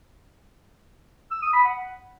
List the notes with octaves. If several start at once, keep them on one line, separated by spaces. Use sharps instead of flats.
E6
D#6
B5
F#5